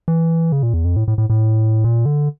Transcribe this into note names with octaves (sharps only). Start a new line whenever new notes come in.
E3
C#3
A#2
E2
F2
A2
A2
A2
A2
A#2
D3